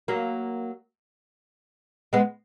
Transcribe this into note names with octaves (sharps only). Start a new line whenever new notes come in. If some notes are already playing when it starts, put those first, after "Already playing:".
F#3 A#3
G#3 B3